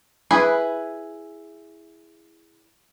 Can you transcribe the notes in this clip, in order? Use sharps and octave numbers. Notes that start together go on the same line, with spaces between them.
E4 G#4 B4